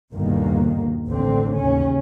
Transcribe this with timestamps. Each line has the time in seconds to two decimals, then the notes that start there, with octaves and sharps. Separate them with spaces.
0.14 G1 D#2 B2 D#3 A#3
1.09 A1 D2 D3 C4
1.56 D#2 C#3 C#4